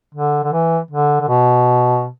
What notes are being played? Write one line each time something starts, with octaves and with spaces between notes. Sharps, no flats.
D3
D3
E3
D3
D3
B2